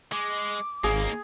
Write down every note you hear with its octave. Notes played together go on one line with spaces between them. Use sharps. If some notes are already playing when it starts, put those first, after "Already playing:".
G#3 D6
G#1 D#2 A#3 G#4